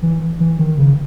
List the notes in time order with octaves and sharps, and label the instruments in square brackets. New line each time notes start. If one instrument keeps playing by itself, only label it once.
[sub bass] E3
E3
D#3
C#3